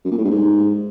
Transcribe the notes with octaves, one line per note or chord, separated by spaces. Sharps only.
F#2
A#2
A2
G2
G#2